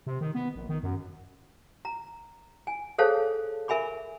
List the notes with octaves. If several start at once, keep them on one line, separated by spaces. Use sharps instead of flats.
C3
D#3
B3
A#1
D#3
F#2
A#5
G#5
G#4 A4 C5 C#5 F5 A5
A#4 E5 G#5 B5 D6